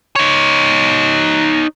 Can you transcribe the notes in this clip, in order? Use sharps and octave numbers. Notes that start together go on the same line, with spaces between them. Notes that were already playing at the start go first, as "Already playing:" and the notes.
D#4 C#5